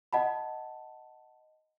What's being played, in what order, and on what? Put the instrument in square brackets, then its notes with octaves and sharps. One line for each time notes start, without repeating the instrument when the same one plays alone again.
[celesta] D#5 F#5 A5 B5